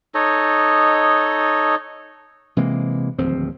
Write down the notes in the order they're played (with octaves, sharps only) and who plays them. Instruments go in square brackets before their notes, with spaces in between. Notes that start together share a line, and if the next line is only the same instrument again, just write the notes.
[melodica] D#4 A4 C#5 D#5
[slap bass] C3 E3 G#3 A#3
D1 D#2 F3 C4